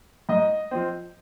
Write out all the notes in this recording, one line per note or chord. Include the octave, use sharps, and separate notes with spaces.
G#2 D#5
F3 C4